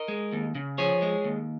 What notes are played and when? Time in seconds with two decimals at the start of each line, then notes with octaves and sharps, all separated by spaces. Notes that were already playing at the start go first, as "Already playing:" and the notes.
Already playing: A#4 D#5
0.08 G#3
0.32 D#2
0.55 C#3
0.78 F3 G#4 C#5
1.02 G#3
1.24 D#2